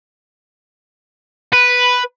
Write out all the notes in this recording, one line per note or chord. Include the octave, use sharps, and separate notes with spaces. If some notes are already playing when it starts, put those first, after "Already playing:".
B4